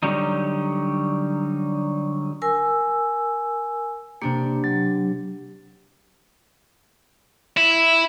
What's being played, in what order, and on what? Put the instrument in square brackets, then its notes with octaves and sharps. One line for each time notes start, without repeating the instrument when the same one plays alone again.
[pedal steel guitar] D3 F#3 G3 D#4
[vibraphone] A#4 G#5 E6
[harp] C3 D4 G4 [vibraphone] A#3
[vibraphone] F#3
[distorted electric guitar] E4